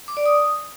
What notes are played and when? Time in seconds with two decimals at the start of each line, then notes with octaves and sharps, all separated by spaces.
0.08 D6
0.17 D5
0.26 D#6